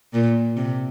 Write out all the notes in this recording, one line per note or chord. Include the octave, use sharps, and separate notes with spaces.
A#2
C3